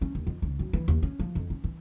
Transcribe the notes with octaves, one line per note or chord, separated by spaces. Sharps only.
C#4
D#2
F2
C#2
F#2
E3
D#2
C#4
F3
F2
C#4
E3